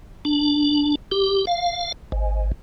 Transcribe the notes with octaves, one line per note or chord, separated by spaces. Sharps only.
D4
G4
F5
G#1